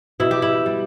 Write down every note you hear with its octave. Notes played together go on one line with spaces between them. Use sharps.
B2 E4
G4
E4
G3